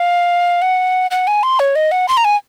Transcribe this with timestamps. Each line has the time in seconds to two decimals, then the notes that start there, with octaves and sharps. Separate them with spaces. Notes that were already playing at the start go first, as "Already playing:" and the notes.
Already playing: F5
0.62 F#5
1.11 F#5
1.27 G#5
1.43 C6
1.60 C#5
1.76 D#5
1.91 F#5
2.08 C6
2.17 A#5
2.25 G#5